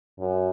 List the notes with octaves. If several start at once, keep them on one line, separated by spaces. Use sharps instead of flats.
F#2